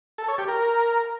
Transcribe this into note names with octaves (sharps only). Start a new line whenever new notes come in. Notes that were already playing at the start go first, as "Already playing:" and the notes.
A4
C#5
G4
A#4